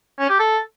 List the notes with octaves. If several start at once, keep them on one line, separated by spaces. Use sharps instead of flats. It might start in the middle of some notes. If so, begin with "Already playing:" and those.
C#4
G4
A4